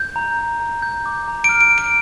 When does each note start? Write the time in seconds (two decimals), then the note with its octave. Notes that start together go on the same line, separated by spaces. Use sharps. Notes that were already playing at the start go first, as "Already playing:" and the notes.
Already playing: G6
0.16 A#5
0.39 A#5
0.60 A#5
0.82 G6
1.06 D6
1.28 A#5
1.44 D7
1.49 F6
1.61 D7
1.72 F6
1.78 D7